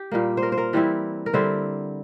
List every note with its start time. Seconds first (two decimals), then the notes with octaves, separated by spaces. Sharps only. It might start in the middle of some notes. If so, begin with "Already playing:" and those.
Already playing: G4
0.11 A#2 G3 A#3
0.37 C5
0.43 A#4
0.52 C5
0.58 A#4
0.73 E3 G3 C4 E4
1.26 A#4
1.34 D3 G3 C4 E4 C5